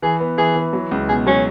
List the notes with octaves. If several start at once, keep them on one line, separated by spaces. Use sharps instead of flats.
E3 G#4
B3
E3 G#4
E3
F#3
C#2
B2 G#4
F#3 C#4